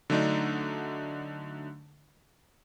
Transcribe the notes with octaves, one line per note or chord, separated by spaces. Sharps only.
D3 F#3 A3 D4 D#4